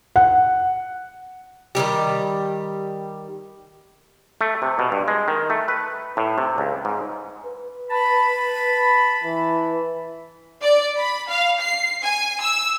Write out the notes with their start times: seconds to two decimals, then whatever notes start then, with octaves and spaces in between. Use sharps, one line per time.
0.16 F#5
1.75 D#3 E3 G3 G4
4.41 A3
4.62 C3
4.79 B2
4.92 G2
5.08 G#3
5.28 D#3
5.50 A3
5.68 B4
6.17 A2
6.38 C3
6.58 C#2
6.85 G#2
7.46 B4
7.91 A5 B5
9.24 E3
10.63 D5
10.97 B5
11.29 F5
11.60 C7
12.05 G#5
12.42 E6